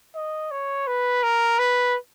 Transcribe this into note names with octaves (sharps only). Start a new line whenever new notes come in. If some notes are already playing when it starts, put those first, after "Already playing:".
D#5
C#5
B4
A#4
B4